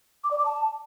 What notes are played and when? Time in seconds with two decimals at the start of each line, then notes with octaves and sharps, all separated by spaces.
0.24 D6
0.31 D5
0.38 D6
0.45 A5